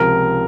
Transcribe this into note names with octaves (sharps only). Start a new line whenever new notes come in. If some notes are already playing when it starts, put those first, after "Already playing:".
Already playing: C#2 C3 F3 A#4